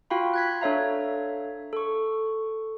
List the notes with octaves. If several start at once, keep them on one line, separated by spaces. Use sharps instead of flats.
F4 F#4 F5 G5 B5
F#6 G#6 B6
D4 A4 C#5 E5 F5 A#5
A4 C#6